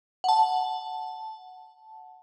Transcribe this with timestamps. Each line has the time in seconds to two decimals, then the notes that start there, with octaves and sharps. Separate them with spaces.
0.24 F#5 A5